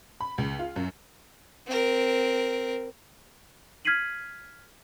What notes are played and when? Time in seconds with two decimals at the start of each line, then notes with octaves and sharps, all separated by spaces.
0.21 B5
0.38 C#2
0.59 F4
0.76 F#2
1.67 C4 A#4
3.85 F6 G#6 B6 C7 D#7 F#7